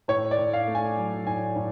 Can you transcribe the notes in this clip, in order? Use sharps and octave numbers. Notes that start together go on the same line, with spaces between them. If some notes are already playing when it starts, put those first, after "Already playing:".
A2 C#5
D5
A2
F5
A3
G#5
F#3
A2 G#5
A2